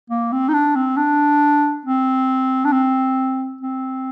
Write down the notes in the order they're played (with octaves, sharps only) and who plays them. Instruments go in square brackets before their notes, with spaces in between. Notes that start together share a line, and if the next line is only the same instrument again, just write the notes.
[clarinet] A#3
C4
D#4
D4
C4
D4
C4
D4
C4
C4